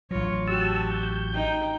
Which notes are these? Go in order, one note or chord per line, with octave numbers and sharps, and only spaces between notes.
A1 F#3 F4 C#5
F#4 G4 A5 E6
G6
D#4 G5